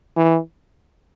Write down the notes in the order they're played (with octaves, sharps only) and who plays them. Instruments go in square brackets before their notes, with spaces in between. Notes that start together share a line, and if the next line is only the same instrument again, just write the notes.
[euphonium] E3